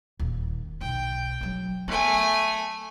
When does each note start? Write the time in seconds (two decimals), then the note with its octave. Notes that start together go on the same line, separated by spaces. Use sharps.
0.20 D#1 D#2
0.81 B1 G5
1.41 F#3 D4
1.88 A3 B3 G#5